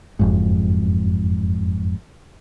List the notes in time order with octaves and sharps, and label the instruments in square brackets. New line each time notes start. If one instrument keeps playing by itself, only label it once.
[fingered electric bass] F#1 F2 G#2